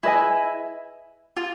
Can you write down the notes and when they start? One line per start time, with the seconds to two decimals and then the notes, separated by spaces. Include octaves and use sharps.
0.03 E4 G#4 B4 D#5 G#5
1.37 F4